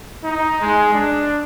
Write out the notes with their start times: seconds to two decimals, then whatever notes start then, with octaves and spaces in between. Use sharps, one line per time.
0.24 D#4
0.61 G#3
0.93 D4